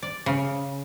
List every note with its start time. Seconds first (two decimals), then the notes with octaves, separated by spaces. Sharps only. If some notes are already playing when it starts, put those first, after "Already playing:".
0.02 D5
0.26 C#3